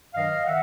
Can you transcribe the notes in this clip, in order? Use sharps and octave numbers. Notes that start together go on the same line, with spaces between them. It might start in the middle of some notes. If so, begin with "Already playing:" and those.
G2 D#3 F#3 D#5 F5
D#3 E5 F#5